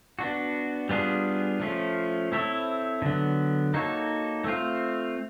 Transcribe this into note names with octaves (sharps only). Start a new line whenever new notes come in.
B3 D4 F#4
G3 B3 D4 F4 G#4
F3 A3 C#4 F4
C4 E4 A4 C#5
D3 F#3 B3
A#3 D#4 F#4 A4 C#5
A3 C4 F4